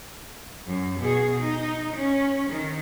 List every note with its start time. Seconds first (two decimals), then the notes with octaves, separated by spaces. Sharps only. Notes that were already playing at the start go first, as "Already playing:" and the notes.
0.67 F#2
1.00 B2 G#4
1.41 D#4
1.96 C#4
2.50 D#3